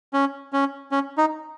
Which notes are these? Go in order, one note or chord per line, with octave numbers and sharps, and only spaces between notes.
C#4
C#4
C#4
D#4